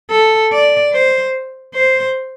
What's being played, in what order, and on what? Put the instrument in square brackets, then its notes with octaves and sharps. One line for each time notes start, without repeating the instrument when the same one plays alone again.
[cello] A4
D5
C5
C5